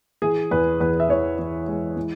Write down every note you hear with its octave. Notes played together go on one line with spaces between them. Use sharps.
E3 G#4
E2 B4
E2 B4
E5
E3 C#5
E3
G#3
E3